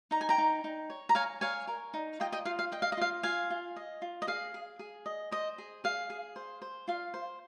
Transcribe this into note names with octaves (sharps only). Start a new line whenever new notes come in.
D#4 A#5
G#5
G5 A#5
D#4
D#4
C#5
A#5
C#5 F5 G#5
C#5 F5 G#5
A#4
D#4
F4 D#5 G5
D#5 G5
F4 F5
F5
D#5 G5
F5
D#5
F4 F5
F4 F5 G#5
F4
D#5
F4
D#5
G#4 F5
G#4
G#4
D#5
C5 D#5
G#4
G#4 F5
G#4
C5
C5
F4 F5
C5